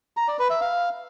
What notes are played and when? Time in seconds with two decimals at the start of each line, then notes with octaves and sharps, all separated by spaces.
0.17 A#5
0.28 D5
0.39 B4
0.50 E5
0.61 F5